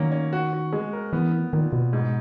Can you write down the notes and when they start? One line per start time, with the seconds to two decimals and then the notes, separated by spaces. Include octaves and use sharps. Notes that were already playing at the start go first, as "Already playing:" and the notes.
Already playing: D#3 F#3 A#3 C#4
0.12 C#4
0.33 F#4
0.53 F#4
0.73 G#3
0.93 A#4
1.13 E3 B3
1.32 B3
1.53 A#2 D#3
1.73 B2 B3
1.93 G#2